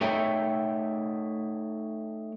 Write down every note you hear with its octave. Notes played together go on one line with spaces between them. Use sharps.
A3 D#4 C#5 E5 G5